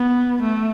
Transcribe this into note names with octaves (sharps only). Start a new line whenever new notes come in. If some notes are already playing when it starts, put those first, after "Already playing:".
Already playing: B3
A3